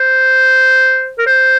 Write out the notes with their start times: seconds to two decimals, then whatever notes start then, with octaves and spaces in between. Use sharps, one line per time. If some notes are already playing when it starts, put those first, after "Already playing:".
Already playing: C5
1.18 A#4
1.27 C5